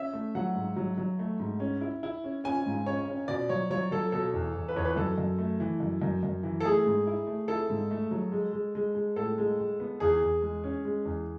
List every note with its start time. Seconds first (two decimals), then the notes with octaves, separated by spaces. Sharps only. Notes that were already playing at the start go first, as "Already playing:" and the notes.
Already playing: C#4 E5
0.13 A3
0.35 F#3 F#5
0.56 G#2
0.76 F#3
0.98 F#3
1.19 A3
1.40 G#2
1.60 C#4
1.81 E4
2.03 E4
2.24 C#4
2.44 C#4 G#5
2.66 G#2
2.86 C#4 C#5
3.08 C#4
3.28 B2 D5
3.49 F#3 C#5
3.70 F#3 C#5
3.91 F#3 A4
4.12 B2 A4
4.33 E2
4.55 E2
4.68 B4
4.76 E2 C#5
4.85 B4
4.96 F#2 A4
5.18 F#2
5.38 A3
5.60 E3
5.80 F#2
6.02 F#2
6.23 F#2
6.43 E3
6.60 A4
6.65 A3 G#4
6.86 G#2
7.07 E4
7.27 A3
7.48 E4 A4
7.70 G#2
7.91 A3
8.11 F#3
8.32 G#3
8.53 G#3
8.75 G#3
8.95 G#3
9.16 A2 A4
9.38 G#3
9.59 G#3
9.80 B3
10.00 E2 G#4
10.22 E2
10.42 G#3
10.64 C#4
10.85 G#3
11.05 E2